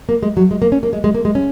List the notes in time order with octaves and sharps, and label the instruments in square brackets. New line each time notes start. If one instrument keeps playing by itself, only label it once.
[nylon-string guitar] A#3
G#3
F#3
G#3
A#3
C#4
A#3
G#3
G#3
A#3
G#3
C#4